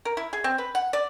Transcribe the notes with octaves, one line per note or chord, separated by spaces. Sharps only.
A#4
E4
G#4
C4
B4
F#5
D5